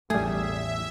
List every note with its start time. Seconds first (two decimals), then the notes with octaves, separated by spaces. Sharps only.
0.10 A1 E2 A2 G3 A3 G#4 E5